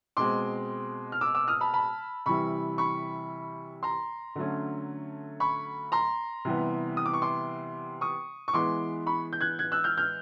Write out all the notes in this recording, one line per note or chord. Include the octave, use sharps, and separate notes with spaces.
B2 G#3 C4 C6 D6
F6
D6 E6
D6 E6
D#6 F6
A5 B5
A5 B5
C3 E3 G3 B5 C#6
B5 C#6
A#5 C6
D3 F#3 A3 C#4
B5 C#6
A#5 C6
C3 E3 G3 B3
D#6
D6
C#6
C6 D6
C#6 D#6
C#6
E3 G#3 B3 C6 D6
B5 C#6
G6
F#6 G#6
F#6 G#6
E6 F#6
F6 G6
F6 G6